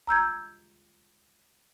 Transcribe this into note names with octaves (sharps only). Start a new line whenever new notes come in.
A#5 E6 G6 G#6